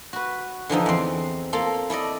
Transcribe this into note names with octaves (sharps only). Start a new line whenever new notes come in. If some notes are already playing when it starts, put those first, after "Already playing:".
F#4 B4
D3 E3 F3 D#4
E2 C4
A#3 F4 A4
E4 A4 D5 D#5